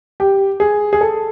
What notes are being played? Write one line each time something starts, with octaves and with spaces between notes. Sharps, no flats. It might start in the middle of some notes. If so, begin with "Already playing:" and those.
G4
G#4
G#4
A4